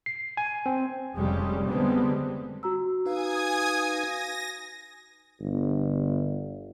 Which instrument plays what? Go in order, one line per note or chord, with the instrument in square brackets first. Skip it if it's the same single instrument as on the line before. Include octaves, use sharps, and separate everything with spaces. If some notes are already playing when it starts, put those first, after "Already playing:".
[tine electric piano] C7
G#5
C4
[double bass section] F1 F2 C#3 G3 G#3
D3 G3 G#3 B3 C4
[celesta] F#4 A#5 E6
[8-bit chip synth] D#4 B4 F5 [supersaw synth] G#5 D#6 G#6
[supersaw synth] A#6
[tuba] G1